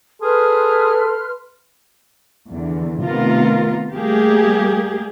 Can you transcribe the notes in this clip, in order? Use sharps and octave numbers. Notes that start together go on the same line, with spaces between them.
G#4 A4 B4 C6 F6
E2 D3
C3 D#3 A3 B3 F4 A#4
G3 A3 A#3 G4 G#4